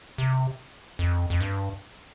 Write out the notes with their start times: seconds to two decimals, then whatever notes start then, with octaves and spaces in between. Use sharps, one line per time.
0.18 C3
0.99 F2
1.30 F2
1.41 G2